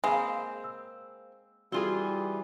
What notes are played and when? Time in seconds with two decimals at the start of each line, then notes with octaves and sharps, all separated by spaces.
0.04 G#3 A#3 C4 G#4 F5 B5
0.64 E6
1.72 E3 G3 C4 F4 F#4 G#4 G7